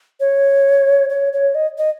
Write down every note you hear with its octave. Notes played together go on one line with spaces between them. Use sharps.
C#5
C#5
C#5
D#5
D#5